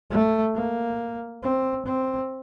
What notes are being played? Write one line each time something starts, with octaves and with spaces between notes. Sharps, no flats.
A3
A#3
C4
C4